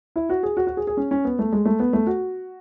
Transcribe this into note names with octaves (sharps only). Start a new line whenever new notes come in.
E4
F#4
G#4
F#4
F#4
G#4
G#4
C#4
C#4
B3
A3
G#3
A3
B3
A3
F#4